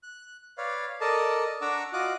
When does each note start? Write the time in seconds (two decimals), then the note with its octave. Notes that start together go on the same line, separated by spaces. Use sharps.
0.03 F#6
0.58 B4 C#5 D5 F5
1.01 A4 A#4 D5 D#5 A5
1.61 D4 F#5 A#5 C#6 D6 E6
1.93 F4 F#4 D#5 D6 F#6